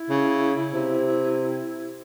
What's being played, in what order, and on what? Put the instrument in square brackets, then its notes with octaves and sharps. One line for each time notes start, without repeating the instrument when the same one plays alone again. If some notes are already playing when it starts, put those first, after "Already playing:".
Already playing: [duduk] E4
[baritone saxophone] C#3
C3